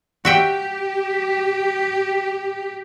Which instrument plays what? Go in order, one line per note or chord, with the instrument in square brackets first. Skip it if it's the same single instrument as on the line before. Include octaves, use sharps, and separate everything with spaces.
[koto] F#4 E5 G5 [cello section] G4